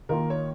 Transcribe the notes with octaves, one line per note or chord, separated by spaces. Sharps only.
D#3 A#3 F4 A#4
C#5